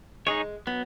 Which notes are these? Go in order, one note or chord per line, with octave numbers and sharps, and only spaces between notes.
G#3 D#4 G#4 C#5
F#3 B3